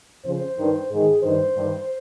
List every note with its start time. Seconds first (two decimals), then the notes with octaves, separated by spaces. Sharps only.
0.25 F2 C#3 C5
0.58 G2 D#3
0.90 G#2 D#3 G#4
1.23 G2 D#3 C5
1.56 G2 D#3